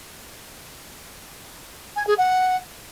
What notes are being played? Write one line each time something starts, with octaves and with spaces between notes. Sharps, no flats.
G#5
G#4
F#5